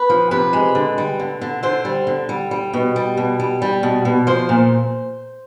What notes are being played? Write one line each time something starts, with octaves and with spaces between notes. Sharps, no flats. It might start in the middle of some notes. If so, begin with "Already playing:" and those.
Already playing: B4
F3
C3 B4
G#3
D3
G3
D3
D3
D3 C5
G3
D3
G3
G3
B2
G3
B2
G3
G3
B2
B2
F3 C5
A#2